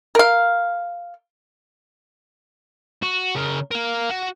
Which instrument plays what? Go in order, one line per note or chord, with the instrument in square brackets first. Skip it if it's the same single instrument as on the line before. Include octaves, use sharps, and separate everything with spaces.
[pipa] A#4 F5
[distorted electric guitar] F#4
C#3 A#4
A#4 F5
F#4